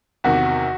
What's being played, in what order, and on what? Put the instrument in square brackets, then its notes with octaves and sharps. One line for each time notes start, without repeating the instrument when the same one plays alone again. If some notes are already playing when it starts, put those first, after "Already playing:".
[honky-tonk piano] E2 C3 D#3 [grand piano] F#4